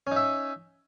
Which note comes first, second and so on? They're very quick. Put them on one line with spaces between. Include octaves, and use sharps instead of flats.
C#4 D#4 E5